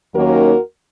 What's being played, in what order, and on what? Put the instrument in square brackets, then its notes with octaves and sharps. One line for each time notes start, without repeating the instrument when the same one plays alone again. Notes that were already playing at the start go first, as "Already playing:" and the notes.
[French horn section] D#2 D#3 F#3 A#3 C#4 F#4 A#4